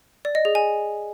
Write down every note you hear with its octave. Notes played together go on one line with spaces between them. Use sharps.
D5
D#5
G#4
G#5